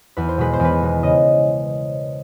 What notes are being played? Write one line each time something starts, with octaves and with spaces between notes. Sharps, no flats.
E2 B4
C5
B2 G#3 B4
C5
E2
B4
B2 G#3
C#3 D#5